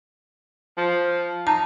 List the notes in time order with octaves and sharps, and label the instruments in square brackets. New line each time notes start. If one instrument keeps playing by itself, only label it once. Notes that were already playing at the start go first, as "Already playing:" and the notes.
[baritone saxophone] F3
[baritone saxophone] D#4 [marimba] A5